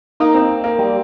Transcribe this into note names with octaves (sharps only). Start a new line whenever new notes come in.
A#3 D#4
C4
A#3
G3